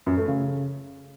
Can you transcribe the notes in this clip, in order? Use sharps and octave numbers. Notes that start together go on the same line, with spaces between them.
F#2
A3
C#3